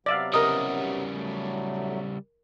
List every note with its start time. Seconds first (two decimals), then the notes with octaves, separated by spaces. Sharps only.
0.06 C3 F#3 B3 D5 E5 F5
0.34 C#3 G3 A#4 D#5 A#5 D#6
1.13 F#3 A3